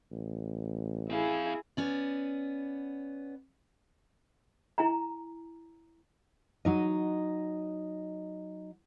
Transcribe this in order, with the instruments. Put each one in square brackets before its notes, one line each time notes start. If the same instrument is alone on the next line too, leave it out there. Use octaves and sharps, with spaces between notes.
[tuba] A1
[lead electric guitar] C4 F5 [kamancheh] E4 G#4
[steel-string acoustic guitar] B3 C#4 D5
[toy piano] E4 G#5 A#5
[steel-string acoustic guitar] F#3 D#4 D#5